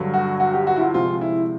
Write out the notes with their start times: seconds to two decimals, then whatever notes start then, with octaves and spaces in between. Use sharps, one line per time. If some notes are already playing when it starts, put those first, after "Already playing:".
Already playing: G2 D3 F#3
0.14 F#4
0.40 F#4
0.53 G4
0.67 F#4
0.76 E4
0.80 F4
0.94 C3 F3 G#3 C4 F4
1.21 E4